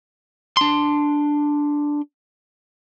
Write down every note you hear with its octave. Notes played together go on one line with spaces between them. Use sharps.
D4 C6